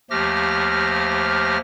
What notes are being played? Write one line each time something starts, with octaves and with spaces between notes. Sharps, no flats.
D#2 F3 A3 G4 F6 A#6